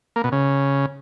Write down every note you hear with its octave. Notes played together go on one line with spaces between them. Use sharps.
A#3
B2
C#3